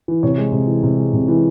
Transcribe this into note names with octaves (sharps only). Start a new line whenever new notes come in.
E3
C3 C#5
G#3
C3
E3
C3
G#3
C3
E3